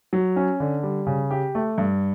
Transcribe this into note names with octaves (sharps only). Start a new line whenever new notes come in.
F#3
C#4
D3
G3
C#3
G4
A3
G2